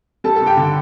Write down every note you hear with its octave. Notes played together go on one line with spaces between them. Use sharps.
G3 A4 A5
A4 A5
G2
G4 G5
D3